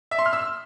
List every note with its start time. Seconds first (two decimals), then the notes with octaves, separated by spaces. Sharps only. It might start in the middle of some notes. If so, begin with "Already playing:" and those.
0.11 E5
0.19 C6
0.26 F6
0.33 E6